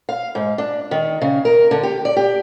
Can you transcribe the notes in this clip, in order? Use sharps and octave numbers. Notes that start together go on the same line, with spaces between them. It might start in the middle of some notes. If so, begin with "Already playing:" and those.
F5
G#2
D4
D#3
C#3
A#4
D3
G4
D5
G4